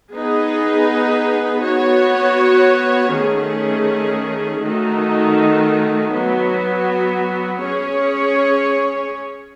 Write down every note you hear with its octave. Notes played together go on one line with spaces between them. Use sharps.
B3 D#4 G#4 B4
B3 F#4 C#5
D#3 A3 C#4 G#4
D#3 A3 D#4 F#4
F#3 B3 F#4
C#4 G#4 C#5